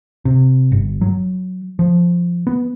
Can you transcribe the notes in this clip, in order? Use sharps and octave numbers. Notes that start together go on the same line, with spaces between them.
C3
G1
F#3
F3
B3